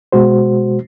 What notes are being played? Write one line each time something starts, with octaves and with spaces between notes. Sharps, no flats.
B2 G#3 F#4 C5